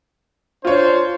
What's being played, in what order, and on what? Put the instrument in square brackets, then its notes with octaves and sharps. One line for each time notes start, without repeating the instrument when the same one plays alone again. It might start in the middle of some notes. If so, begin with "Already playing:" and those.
[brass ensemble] D4 C5 [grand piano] F4 C#5